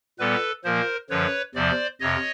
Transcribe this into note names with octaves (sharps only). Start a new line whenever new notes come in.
A#2 G3 B3 A4 B4
A#2 F3 A#3 A#4 C5
F#2 D3 F3 B4 C#5
E2 C3 F3 C5 D5
F2 C3 C#5 D#5